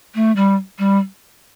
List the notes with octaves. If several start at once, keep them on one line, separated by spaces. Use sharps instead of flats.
A3
G3
G3